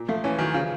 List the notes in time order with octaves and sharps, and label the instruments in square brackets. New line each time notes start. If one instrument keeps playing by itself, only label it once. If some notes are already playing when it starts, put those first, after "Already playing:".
Already playing: [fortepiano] A#2
[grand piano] F3 [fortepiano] A3
[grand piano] E3 [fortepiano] C#4
[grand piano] D#3 [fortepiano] F#3
[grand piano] C#3 [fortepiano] F3